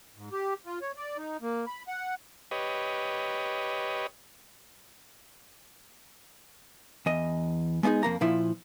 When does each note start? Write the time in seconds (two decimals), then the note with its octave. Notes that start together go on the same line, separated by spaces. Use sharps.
0.16 G#2
0.32 G4
0.66 F4
0.82 C#5
0.97 D5
1.17 D#4
1.42 A#3
1.67 B5
1.88 F#5
2.51 G4 B4 C#5 D#5
7.06 E2 D#5
7.83 G#3 B3 D4 D#4 G#4
8.03 F2 A#3 A#5
8.21 A#2 F3 E4